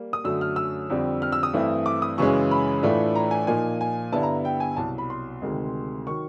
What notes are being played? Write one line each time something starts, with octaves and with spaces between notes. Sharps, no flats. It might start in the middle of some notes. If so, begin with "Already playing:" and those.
Already playing: G3 A#3
D#6
F#2 D3 F#3 A3 E6
F6
E6
F2 D3 G3 C4
F6
E6
D#6
G2 E3 A3 C4 E4
D6
D#6
F#2 C#3 E3 G#3 C#4 C#6
B5
A2 E3 A3 D4 F4
A#5
G#5
A#2 F3 A#3 D#4 G#5
G#5
G2 D3 G3 B3 E4 A5
A#5
G5
G#5
C2 B2 F#3 A5
B5
C6
D2 C3 D#3 G#3
D#3 F#3 C#6